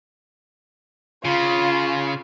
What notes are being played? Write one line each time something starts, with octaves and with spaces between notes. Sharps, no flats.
C#3 F4